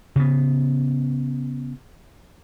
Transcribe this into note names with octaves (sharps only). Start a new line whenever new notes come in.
C#3 B3